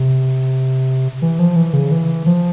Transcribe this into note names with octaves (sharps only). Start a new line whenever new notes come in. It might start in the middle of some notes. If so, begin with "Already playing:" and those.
Already playing: C3
E3
F3
E3
C#3
E3
F3